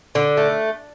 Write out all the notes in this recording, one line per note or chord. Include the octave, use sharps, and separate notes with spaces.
D3
A3